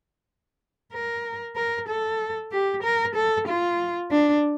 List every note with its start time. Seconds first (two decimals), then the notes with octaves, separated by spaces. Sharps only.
0.93 A#4
1.56 A#4
1.88 A4
2.52 G4
2.83 A#4
3.15 A4
3.47 F4
4.11 D4